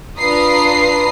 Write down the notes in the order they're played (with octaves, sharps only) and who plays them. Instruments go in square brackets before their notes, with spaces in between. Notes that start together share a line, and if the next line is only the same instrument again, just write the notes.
[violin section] D4 F4 B4 A#5 D#6 C7